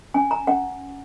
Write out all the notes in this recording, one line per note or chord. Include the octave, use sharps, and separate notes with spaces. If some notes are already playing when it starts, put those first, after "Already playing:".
C#4 G#5
A#5
C#4 F#5